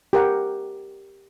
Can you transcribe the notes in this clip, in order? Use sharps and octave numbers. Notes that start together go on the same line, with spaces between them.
G4 A#4 F#5